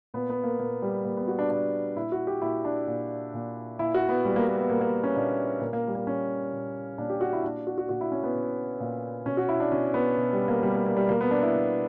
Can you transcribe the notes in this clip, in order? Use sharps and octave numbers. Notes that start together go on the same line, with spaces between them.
A#2 B3
B3
A#3
A#2 A#3
G3
A#2 A#3
B3
F#4
D4
A#2 D4
A#2 E4
F#4
G4
A#2 E4
D4
A#2
A#2
A#2 E4
F#4
B3
A#2 G3
A#3
A#3
B3
A#2 A#3
A#3
C#4
A#2 D4
A#2 A#3
A#3
G3
A#3
A#2 C#4
A#2
A#2 D4
G4
F#4
E4
A#2 D4
F#4
F#4
A#2 F#4
E4
C#4
B3
A#2
A#2
B2 C#4
F#4
E4
D4
B2 C#4
B3
B2
G3
A#3
B2 G3
A#3
A#3
G3
B2 A#3
B3
D4
E4
B2